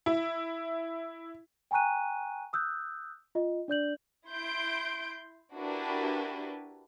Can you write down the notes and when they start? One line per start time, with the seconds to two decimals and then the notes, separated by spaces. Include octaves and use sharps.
0.06 E4
1.71 G5 G#5 A#5 C#6 F#6 D#7
2.53 D#6 E6 F#6 G6
3.35 F4 D#5
3.68 D4 D5 G6 F#7
4.29 E4 C6 G6 D7
5.55 D4 E4 F#4 G4 A#4 B4